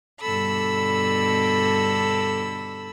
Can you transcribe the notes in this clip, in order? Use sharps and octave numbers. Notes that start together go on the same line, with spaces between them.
G2 B2 D3 A4 B5 E6